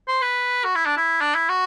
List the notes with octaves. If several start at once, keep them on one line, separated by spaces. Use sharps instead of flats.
C5
B4
F#4
E4
D4
E4
D4
E4
F#4